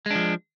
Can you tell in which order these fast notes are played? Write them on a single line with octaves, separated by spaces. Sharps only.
G#3 D4 F3